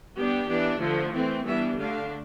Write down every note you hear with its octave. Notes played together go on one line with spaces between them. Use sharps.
G3 B3 D4 G4
E3 B3 D4
D3 F3 A3
E3 A3 C4
E3 G3 B3 D4 E5
D3 A3 D4 F5